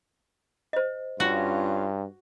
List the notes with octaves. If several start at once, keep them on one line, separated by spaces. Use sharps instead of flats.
C5 D#5
G2 C#4 F4 F#4 C#5